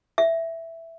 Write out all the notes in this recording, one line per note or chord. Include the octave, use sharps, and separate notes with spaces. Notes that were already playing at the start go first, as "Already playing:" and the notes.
E5